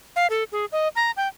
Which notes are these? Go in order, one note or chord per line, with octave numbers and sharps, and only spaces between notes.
F5
A4
G#4
D#5
A#5
G5